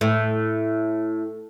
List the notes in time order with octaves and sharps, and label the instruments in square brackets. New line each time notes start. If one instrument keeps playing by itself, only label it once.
[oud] A2